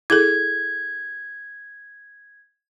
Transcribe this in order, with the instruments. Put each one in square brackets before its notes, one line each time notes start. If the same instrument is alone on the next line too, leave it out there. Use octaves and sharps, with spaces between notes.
[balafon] E4 G#4 A4 [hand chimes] G#6